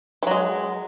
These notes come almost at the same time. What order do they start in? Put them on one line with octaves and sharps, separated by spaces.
E3 F#3 G#3